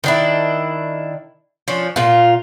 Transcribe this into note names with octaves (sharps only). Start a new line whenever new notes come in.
D#3 D4 E4
F3 C#4 D4
A#2 F4